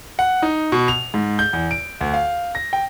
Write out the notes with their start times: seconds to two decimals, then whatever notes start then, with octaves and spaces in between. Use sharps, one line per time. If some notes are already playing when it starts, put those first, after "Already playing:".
0.19 F#5
0.42 D#4
0.72 B2
0.88 F7
1.14 G#2
1.39 G6
1.53 E2
1.71 D7
2.01 D2
2.14 F5
2.55 A#6
2.73 G5